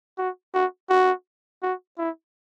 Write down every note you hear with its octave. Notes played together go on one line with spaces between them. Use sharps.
F#4
F#4
F#4
F#4
E4